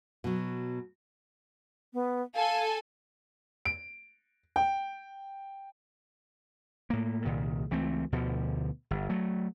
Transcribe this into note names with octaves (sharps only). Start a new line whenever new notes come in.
B2 F#3
B3
A4 F5 G#5
D7
G5
A2 A#3
C2 A#2 D#3
C#2 E3 A3 C4
D2 B2 D3 F3
G1
F#3 A3